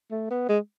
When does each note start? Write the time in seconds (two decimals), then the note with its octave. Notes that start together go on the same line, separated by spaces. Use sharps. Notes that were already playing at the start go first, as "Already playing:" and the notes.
0.11 A3
0.30 B3
0.49 G#3